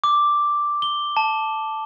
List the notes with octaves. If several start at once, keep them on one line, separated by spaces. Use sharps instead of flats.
D6
G7
A5